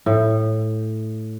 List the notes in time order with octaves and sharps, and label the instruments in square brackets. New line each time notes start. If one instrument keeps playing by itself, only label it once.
[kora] A2